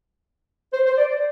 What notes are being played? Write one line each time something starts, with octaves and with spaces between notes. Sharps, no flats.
C5
C5
D5